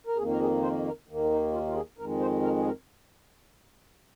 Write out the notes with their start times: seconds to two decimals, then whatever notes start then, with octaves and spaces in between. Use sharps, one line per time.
0.07 A#4
0.16 F2 D#3 A#3 G#4
0.30 A#4
0.40 G#4
0.62 C5
0.85 A#4
1.08 D#2 D#3 A#3
1.24 C4
1.31 D#4
1.52 F4
1.67 F4
1.75 G#4
1.98 F2 D#3 G#3 A#4
2.20 C5
2.42 A#4
2.58 G#4
2.65 A#4